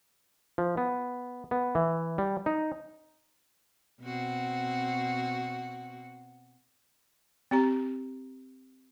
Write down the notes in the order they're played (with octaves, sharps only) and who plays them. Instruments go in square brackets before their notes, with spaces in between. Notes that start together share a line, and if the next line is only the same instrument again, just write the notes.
[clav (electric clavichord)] F3
B3
B3
E3
G3
D#4
[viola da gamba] B2 C4 F#4
[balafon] C4 G4 A#5